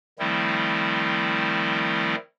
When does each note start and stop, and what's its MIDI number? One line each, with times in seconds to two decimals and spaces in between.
0.19 2.15 51
0.19 2.15 53
0.19 2.15 55
0.19 2.15 57
0.19 2.15 60
0.19 2.15 64